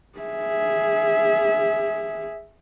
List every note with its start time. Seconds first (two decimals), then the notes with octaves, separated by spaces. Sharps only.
0.18 G#4 E5